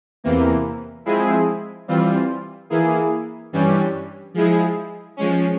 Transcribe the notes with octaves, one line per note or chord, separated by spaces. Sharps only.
E2 C3 E3 A#3
F3 G#3 C4 E4 G#4
E3 G3 C4 F4
E3 A#3 E4 G#4
G2 E3 G3 C#4 G4
F3 G#3 E4 G#4
F3 G#3 C#4